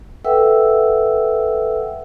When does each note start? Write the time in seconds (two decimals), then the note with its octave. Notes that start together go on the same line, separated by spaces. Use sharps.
0.25 A4 B4 E5 F#5 G5 E6